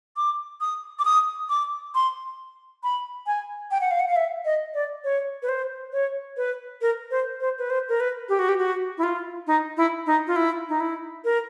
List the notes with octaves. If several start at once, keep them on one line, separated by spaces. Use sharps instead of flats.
D6
D#6
D6
D#6
D6
C6
B5
G#5
G5
F#5
F5
F#5
F5
E5
D#5
D5
C#5
B4
C5
C#5
B4
A#4
C5
C5
B4
C5
A#4
B4
G4
F#4
G4
F#4
E4
F4
D#4
E4
D#4
F4
E4
D#4
E4
A#4